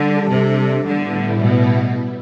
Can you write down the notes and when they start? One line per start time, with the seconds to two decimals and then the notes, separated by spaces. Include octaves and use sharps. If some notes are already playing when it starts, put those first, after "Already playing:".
Already playing: D3 G3 D4 A4
0.31 C3
0.86 A2 D3 G3 B3 E4
1.42 B2